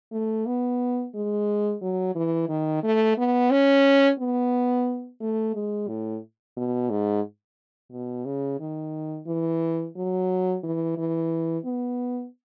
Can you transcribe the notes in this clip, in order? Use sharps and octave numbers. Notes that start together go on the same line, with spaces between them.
A3
B3
G#3
F#3
E3
D#3
A3
B3
C#4
B3
A3
G#3
A2
B2
G#2
B2
C#3
D#3
E3
F#3
E3
E3
B3